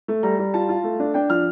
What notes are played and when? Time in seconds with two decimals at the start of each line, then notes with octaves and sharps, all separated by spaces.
0.08 A3
0.23 G3 A#5
0.39 G3
0.54 F4 A5
0.69 F4
0.84 A3
1.00 D4
1.14 D4 G5
1.30 F3 F6